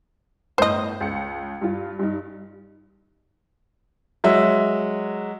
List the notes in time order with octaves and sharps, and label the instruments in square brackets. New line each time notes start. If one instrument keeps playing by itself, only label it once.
[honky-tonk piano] G1 A2 G6 [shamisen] C5 D#5
[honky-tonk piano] C#2 C#7
G2 F4
G2 D#4
[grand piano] F#3 G#3 E5